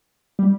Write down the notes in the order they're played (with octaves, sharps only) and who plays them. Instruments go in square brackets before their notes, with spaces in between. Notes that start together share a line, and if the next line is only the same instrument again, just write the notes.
[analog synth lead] G3